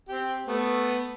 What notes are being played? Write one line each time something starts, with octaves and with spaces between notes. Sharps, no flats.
C4 G4
A3 B3